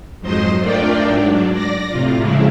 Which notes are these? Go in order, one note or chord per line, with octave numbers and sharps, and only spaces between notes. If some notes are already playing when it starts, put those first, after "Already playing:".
F2 G#2 F#3 C5 D#5 C6
A3 D4 F4 A#4 D5 G5
G#2 F#3 D4
D5 A#6
A2 C3 F4
A2 C#3 F3 F#3 G#3 E4